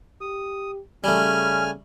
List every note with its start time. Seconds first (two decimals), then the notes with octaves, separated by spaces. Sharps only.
0.21 G4 D#6
1.04 C#3 G3 A3 C#4 G#5 F6